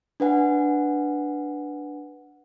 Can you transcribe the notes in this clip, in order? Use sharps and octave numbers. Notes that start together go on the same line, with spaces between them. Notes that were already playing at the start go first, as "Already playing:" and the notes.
D4 B4 F#5 G#5